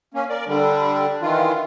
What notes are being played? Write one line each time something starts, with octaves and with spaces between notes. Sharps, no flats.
A#3 C#4
A#4 D5
D3 G3 D4
D#3 E3 F4